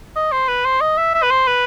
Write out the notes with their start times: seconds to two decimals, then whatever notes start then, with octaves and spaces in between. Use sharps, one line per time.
0.16 D#5
0.32 C5
0.48 B4
0.65 C5
0.81 D#5
0.98 E5
1.14 E5
1.23 B4
1.31 C5
1.47 B4